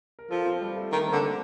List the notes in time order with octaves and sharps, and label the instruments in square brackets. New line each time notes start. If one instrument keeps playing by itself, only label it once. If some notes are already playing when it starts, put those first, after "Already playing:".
[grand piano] A#4
[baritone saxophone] F3 [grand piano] A4
[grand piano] C4
G3
A3
[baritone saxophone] D#3 [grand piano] A#3
[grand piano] C4
[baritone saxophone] D3
[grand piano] A4